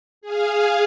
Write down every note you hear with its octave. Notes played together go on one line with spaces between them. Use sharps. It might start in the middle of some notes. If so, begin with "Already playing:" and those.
G#4 F5